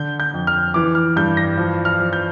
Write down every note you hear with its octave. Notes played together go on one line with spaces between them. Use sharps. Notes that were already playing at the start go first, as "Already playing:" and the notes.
Already playing: D3 G6
G6
F2
F6
E3 D6
F6
G2 G6
A#6
F3
F6
F3
G6